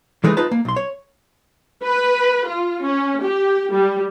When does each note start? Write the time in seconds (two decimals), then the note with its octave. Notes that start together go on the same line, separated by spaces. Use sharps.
0.24 E3 G#3 A3 D#4 G#4 B4
0.37 D#4 F4 B4 A5
0.51 A#3
0.65 B1 C6
0.76 C#5
1.84 B4
2.47 F4
2.82 C#4
3.22 G4
3.73 G3